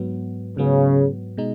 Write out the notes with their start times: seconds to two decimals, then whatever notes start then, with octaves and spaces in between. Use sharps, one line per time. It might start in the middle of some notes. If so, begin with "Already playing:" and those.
Already playing: G#2 F#3 B3
0.57 G#2 C#3 F#3 B3
1.38 B2 G#3 D#4